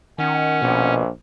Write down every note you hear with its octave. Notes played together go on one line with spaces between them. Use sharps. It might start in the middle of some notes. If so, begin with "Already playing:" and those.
D#3 C#4 F#5
A#1 B2